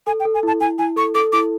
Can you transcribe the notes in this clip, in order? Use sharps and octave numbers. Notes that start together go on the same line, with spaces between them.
A4 G#5
G5
A4
G#5
E4 A5
E4 G#5
E4 G#5
A4 C#6
A4 D6
E4 D6